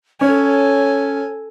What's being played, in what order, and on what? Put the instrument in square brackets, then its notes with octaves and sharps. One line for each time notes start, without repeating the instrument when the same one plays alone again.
[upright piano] C#4 [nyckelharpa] A4 G#5 [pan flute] C#5